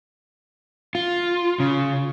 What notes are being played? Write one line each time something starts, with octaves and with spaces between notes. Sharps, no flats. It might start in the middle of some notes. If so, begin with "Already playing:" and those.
F4
C#3